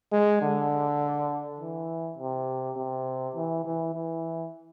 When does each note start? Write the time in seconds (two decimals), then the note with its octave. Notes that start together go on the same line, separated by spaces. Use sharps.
0.12 G#3
0.42 D3
1.60 E3
2.18 C3
2.76 C3
3.36 E3
3.65 E3
3.94 E3